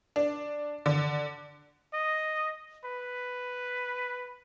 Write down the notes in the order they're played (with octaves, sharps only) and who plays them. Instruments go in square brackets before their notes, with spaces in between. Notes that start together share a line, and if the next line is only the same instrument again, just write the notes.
[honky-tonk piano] D4
D3
[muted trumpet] D#5
B4